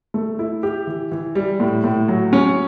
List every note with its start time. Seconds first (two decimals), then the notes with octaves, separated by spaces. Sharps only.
0.14 A3
0.39 E4
0.63 G4
0.87 E3
1.12 E3
1.35 G3
1.60 A2
1.84 A2
2.08 F#3
2.33 C#4